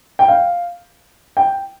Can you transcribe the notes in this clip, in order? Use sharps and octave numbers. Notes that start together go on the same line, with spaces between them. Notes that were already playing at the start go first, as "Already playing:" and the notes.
G5
F5
G5